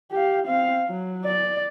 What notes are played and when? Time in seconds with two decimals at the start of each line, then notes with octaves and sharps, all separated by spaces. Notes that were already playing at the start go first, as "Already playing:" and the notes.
0.12 G4 F5
0.46 C4 F5
0.88 F#3
1.25 D5